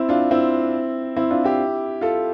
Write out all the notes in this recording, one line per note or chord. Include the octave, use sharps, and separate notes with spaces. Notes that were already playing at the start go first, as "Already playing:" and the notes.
Already playing: C4 E4
D4 F4
C4 E4
C4 E4
D4 F4
E4 G4
F4 A4